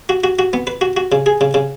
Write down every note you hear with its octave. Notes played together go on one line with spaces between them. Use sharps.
F#4
F#4
F#4
B3
B4
F#4
F#4
C#3
G#4
C#3
C#3